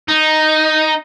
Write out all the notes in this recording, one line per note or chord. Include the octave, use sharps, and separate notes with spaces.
D#4